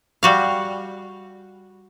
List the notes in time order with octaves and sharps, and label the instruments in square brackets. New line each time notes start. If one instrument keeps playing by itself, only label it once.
[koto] G3 F#4 F5